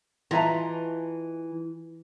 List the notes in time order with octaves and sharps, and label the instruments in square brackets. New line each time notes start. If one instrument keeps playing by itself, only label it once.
[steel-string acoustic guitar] E3 [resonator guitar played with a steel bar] G#3 F#4 A5 [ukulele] F4 E5 A#5